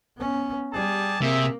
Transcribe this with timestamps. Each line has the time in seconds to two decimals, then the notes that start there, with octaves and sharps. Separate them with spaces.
0.17 B3 C#4
0.74 G3 G4 G#4 A5
1.21 C3 A#3 G#4 E5